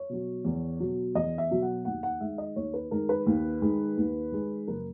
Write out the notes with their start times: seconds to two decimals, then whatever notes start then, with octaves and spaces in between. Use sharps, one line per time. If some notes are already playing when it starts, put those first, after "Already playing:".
Already playing: C#5
0.09 B2 F#3
0.45 E2
0.80 B2 F#3
1.15 E2 D#5
1.38 E5
1.51 B2 F#3
1.62 F#5
1.85 D#2 F#5
2.03 F#5
2.21 D#3 G#3 E5
2.38 D#5
2.56 D#2 C#5
2.74 B4
2.91 D#3 G#3 A#4
3.09 B4
3.27 D#2
3.62 D#3 G#3
3.97 D#2
4.32 D#3 G#3
4.68 F#1 A#4